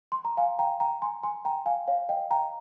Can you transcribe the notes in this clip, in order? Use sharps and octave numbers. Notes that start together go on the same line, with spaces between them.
C6
A#5
F5 G#5
G5 A#5
G5 A#5
G#5 C6
G#5 C6
G5 A#5
F5 G#5
C#5 F5
D#5 G5
G5 A#5